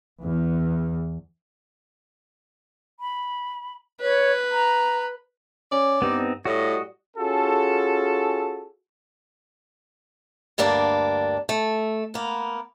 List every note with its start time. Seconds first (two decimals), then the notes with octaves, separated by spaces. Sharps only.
0.23 E2
3.00 B5
4.01 B4 C#5
4.51 A#5
5.72 C#4 D5
6.02 G2 B3 C4 D#4
6.45 A2 G3 F#4 D#5
7.16 C#4 F4 F#4 G#4 A4
10.58 D2 G2 A#3 D4 D5
11.49 A3
12.14 A#3 B3